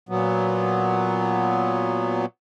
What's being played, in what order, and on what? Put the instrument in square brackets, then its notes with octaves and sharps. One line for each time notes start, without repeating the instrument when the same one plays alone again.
[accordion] A#2 F#3 B3